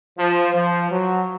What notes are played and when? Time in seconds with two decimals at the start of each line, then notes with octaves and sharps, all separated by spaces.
0.18 F3
0.53 F3
0.90 F#3